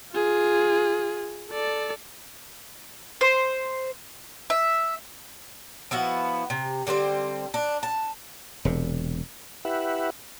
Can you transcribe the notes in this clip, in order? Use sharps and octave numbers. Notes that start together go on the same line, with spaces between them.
F4 G#4
A4 D5
C5
E5
F3 B3 E4 F#4
C3
D3 G3 C4 C5
D4
A5
E1 C3
E4 G4 B4 E5 F#5